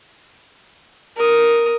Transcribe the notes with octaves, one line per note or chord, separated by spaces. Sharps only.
A#4 D#6